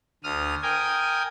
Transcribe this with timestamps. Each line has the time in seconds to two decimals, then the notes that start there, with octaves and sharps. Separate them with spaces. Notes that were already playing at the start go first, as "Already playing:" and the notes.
0.24 D2 D#6 F6
0.63 A#4 G5 G#5 D#6